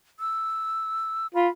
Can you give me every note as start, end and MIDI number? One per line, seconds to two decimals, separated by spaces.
0.20 1.27 88
1.35 1.48 65
1.35 1.50 83